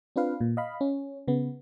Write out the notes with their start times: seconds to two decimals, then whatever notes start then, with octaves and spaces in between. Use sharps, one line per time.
0.16 C4 D4 F4 B4 F5
0.41 A#2
0.57 D#5 F5 B5
0.81 C#4
1.28 C#3 B3